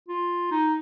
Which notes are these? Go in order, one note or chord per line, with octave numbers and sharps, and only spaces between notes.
F4
D#4